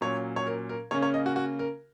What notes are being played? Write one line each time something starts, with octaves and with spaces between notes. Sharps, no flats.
A#2 F#3 C#4 C#5
C#5
A#4
A#4
C#3 A#3 C#4 C#5
C#5
D#5
F#4
F#4
A#4